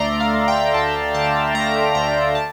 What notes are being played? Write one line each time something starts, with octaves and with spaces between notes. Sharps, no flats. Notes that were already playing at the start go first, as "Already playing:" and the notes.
Already playing: D2 D3 A3 D5 E5 A#5 C6
F5
D2
G5
D2 A5
D3 A5
A3 A#5
D2 A#5
A5